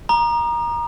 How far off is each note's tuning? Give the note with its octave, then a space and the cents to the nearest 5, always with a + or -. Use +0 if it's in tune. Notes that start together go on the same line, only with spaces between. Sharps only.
A#5 +20 D#6 -40